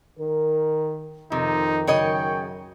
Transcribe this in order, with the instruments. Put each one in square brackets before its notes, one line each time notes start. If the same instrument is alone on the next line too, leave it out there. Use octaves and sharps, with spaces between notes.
[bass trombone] D#3 [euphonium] A#4
[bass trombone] F2 [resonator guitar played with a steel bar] C3 [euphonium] D#3 [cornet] D#4
[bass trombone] F#2 [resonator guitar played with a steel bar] C#3 C#5 D#5 [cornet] G5